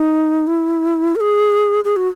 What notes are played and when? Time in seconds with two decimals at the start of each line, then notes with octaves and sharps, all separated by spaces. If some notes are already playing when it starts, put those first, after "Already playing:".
Already playing: D#4
0.47 E4
1.16 A#4
1.20 G#4
1.84 G#4
1.96 F#4